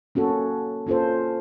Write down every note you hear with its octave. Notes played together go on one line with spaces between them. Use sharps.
A#3 C#4 F#4 A4
A#3 C#4 F4 A4 C5